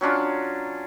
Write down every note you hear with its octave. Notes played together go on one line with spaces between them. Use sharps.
F#3 C#4 D4 F4